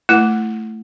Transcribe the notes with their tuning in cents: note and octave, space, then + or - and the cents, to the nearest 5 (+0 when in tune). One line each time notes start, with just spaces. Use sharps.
A3 +0 E4 +20